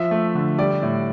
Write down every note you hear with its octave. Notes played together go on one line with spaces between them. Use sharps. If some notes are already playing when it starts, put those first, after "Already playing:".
Already playing: F3 E5
A3
D3
G3 D5
A2